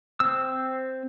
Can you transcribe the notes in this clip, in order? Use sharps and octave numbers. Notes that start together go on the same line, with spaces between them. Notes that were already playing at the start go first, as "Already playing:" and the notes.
C4 E6